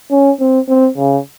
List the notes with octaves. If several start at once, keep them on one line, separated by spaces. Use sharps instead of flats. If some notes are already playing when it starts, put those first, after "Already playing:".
C#4
C4
C4
C#3